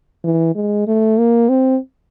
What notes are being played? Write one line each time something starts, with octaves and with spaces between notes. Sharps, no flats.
E3
G#3
A3
A#3
C4